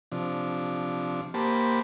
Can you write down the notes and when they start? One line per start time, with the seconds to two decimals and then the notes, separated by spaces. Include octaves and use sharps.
0.12 C3 F3 D4
1.34 A#3 G4 C5 A5 B5